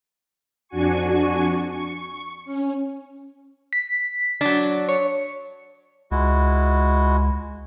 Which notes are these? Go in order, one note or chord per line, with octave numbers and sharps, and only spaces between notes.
F2 D4 F#4 G#5 C#6
C#6
C#4
B6
F#3 D4
C#5
C#2 G#3 E4 F#4